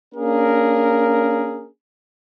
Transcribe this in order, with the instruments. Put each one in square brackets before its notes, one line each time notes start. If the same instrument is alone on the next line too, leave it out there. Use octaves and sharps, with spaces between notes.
[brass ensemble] A#3 C#4 D4 G#4 A#4